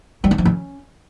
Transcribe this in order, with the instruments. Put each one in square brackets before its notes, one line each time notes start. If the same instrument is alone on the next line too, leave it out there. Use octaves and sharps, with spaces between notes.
[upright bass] G3
C#4
F3
C#4